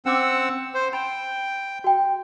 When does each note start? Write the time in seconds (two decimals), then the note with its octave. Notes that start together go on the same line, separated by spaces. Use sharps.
0.06 C4 C#4 F#5 D6 E6
0.74 C5
0.93 G5 B5
1.84 F#4 G5